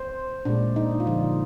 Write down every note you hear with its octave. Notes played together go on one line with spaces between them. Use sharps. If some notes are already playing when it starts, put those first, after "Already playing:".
Already playing: C5
A#2 G#3 D4
D#4
F4
D3 F3 G#3 D#4